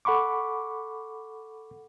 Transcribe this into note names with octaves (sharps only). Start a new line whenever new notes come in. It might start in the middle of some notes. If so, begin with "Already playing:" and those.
A4 F#5 B5 C#6 D6